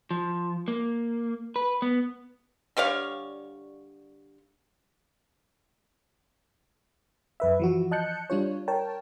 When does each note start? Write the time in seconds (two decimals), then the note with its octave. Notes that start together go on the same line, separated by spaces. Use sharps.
0.11 F3
0.68 A#3
1.56 B4
1.82 B3
2.77 D3 G3 C#5 F5
7.40 F#2 B4 E5
7.60 E3 F3 F#4
7.91 D#5 A5 F#6 G6 C#7
8.30 G3 D4 F4 C#5
8.68 A#4 C#5 G5 A5